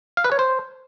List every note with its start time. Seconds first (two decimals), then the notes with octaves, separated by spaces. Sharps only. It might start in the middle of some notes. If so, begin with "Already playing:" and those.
0.17 F5
0.24 B4
0.32 C#5
0.39 C5